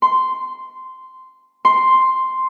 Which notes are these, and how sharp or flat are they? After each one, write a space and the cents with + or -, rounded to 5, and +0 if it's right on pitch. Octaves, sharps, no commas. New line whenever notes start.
C6 -10
C6 +0